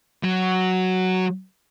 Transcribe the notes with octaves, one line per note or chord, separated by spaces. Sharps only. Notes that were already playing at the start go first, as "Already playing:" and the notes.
F#3 F#4